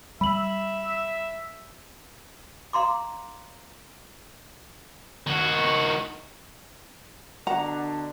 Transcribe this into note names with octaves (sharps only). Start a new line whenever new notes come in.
G3 E5 B5 F#7
F5 A#5 C6 D6
D#3 F#4
B2 D3 D4 F#5 A#5